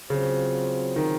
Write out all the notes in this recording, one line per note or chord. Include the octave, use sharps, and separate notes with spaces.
C#3 F#3 C4 F4 C5
D#3